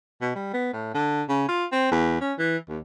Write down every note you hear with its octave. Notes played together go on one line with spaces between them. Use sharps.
B2
G3
B3
A2
D3
C#3
F4
C4
E2
C#4
E3
D#2